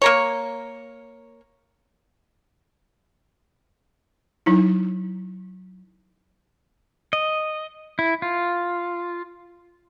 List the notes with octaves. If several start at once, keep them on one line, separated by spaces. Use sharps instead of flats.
A#3 A#4 C#5
F#3 D#4 E4
D#5
E4
F4